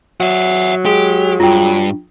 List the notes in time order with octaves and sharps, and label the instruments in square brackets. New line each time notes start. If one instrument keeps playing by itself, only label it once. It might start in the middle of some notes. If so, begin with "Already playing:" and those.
[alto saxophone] F#3 [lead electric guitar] E5 F#5
[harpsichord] G#3 [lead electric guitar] G4
[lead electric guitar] G2 [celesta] F4 G5